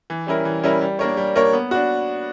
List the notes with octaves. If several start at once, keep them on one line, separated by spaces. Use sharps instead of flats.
E3
G3 C#4 E4 A#4
E3
G3 C#4 E4 A#4
G3
A#3 D4 A#4 C#5
G3
A#3 D4 A#4 C#5
B3
D4 F#4